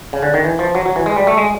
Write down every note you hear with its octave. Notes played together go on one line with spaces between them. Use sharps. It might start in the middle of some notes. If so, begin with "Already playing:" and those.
C#3
D3
D#3
E3
F3
F#3
F#3
E3
G#3
G3
A3
G#3